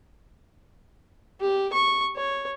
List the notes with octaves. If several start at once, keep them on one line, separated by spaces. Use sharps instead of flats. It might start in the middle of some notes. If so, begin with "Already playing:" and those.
G4
C#6
C#5